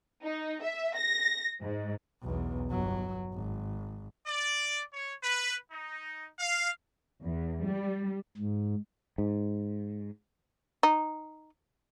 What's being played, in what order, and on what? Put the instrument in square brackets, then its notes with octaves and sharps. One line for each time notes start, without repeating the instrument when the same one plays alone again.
[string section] D#4
E5
A#6
G#2
[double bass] B1 E2
G1 F#3
G#1
[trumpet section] D5
C#5
B4
D#4
F5
[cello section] E2
G3
[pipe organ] G#2
[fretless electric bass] G#2
[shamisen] D#4